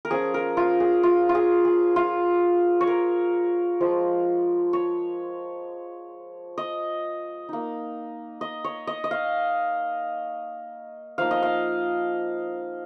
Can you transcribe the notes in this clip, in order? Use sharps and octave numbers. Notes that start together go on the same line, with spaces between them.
A#4
F3 C#4 F4 G#4
A#4
F4
G#4
F4
F4
G#4
G#4
F4
C#5
A#4
F3 G#3 F4
C#5
D#5
A#3 D#4
D#5
C#5
D#5
D#5
F5
F3 A#3 D#4 F5
D#5
F5